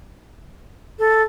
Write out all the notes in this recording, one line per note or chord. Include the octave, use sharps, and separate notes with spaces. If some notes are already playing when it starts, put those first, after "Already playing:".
A4